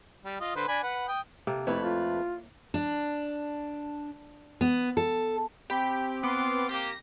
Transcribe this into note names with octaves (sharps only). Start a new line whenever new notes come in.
G3
F4 D#5
D3 B4 C5
D4 G#5 B5
B4 F#5
G5 D#6
C3 A#3 A4
F2 A3 E4 B4 C#5
F4
D4
B3
A4
C4 G4 G5 B5
B3 F4 C6 D6
A#3 G4 A#6